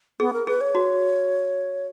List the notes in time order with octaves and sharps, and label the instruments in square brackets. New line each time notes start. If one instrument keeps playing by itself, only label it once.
[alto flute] B3 [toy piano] G#4
[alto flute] A#4
[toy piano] G#4 [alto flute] B4
[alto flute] C#5
[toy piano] F#4